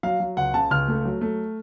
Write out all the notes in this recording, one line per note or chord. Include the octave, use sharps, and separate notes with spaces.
F#3 F5
F#3
C#2 F#5
C#3 A5
C#2 F6
A3
F#3
A3